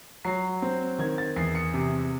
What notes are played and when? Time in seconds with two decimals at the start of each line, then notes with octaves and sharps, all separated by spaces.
0.25 F#3 C7
0.62 C4
0.99 D#3 G#6
1.18 A6
1.36 E2 C7
1.55 C#7
1.74 C3